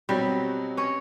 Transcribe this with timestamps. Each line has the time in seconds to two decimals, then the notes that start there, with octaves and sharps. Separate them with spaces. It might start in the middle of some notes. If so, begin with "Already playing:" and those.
0.09 B2 F#3 G3 C4
0.77 C#4 C#5